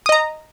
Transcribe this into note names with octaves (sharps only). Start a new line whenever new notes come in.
D#5 A#5 D#6